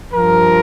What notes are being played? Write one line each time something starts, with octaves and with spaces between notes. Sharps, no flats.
G2 F3 A#4